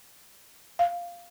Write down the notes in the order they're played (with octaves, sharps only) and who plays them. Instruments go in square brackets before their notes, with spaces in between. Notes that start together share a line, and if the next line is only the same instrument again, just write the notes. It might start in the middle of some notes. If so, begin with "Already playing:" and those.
[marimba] F5